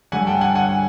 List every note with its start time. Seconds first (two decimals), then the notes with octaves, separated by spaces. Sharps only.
0.12 G2 D3 G3 F#5 G#5
0.27 G5 A5
0.41 F#5 G#5
0.55 F#5 G#5